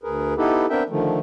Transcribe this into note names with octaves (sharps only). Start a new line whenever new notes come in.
D2 G#4 A#4 B4
B3 D#4 E4 G4 A4 B4
B3 C4 D4 A#4 E5 G5
D3 D#3 F3 A3